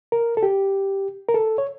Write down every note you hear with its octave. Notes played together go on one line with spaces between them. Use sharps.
A#4
A4
G4
A#4
A4
C#5